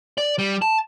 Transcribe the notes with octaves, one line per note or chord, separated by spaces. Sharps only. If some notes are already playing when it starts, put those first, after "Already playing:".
D5
G3
A5